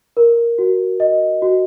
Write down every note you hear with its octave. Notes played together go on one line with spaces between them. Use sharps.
A#4
F#4
D#5
F#4